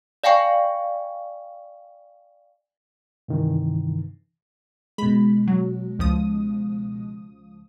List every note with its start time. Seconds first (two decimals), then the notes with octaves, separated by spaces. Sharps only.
0.24 D5 F5 G5 G#5 C#6
3.28 G2 C3 D#3 E3
4.98 B2 G#3 B5
5.47 F#3
5.99 C#2 F3 D#6